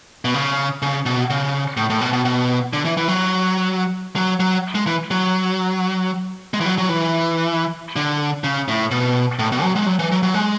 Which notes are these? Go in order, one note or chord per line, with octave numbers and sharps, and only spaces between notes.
B2
C#3
C#3
B2
C#3
A2
A2
B2
B2
B2
D3
E3
E3
F#3
F#3
F#3
G#3
E3
F#3
G#3
E3
F#3
F#3
E3
D3
C#3
A2
B2
A2
B2
F#3
G#3
F#3
E3
F#3
F#3
G#3